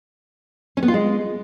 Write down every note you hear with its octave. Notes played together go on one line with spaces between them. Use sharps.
C#4
B3
F4
G#3